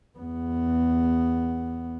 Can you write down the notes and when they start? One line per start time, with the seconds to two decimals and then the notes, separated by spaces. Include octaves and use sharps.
0.19 E2 B3